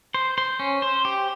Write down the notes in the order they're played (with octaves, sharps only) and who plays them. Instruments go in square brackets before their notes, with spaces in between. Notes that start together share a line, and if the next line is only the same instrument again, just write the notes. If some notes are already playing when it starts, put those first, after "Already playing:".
[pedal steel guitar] C5
C5
C#4
C5
G4